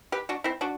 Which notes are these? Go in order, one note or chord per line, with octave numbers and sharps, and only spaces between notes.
G4 B4
D4 F#4
C4 E4
D4 F#4